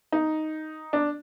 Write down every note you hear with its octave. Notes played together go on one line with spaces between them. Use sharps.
D#4
D4